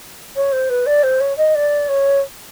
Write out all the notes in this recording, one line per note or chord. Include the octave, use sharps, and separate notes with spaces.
C#5
C5
B4
D5
C5
C#5
D#5
D5
C#5